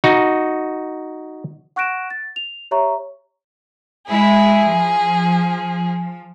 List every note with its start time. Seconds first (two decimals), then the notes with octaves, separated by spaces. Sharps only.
0.04 D#4 F#4
1.76 F#5 C#6 F#6 A#6 D7 E7
2.10 A6
2.36 F7
2.71 G4 C#5 E5 A#5 C#6
4.08 G#3 E4 G#4
4.65 F3